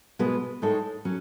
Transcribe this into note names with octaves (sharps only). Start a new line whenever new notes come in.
B2 G#3 B3 F#4 B4
A2 G#3 D#4 A4 C#5
F#3 C#4